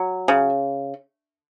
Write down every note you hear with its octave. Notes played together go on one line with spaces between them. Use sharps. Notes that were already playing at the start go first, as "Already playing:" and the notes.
Already playing: F#3
C#3